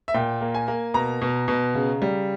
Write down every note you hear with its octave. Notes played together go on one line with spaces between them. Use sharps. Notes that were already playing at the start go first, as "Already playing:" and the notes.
E5
A#2 G5
A#3
G#5
A#3
B2 A#5
B2
B2
C#3
G3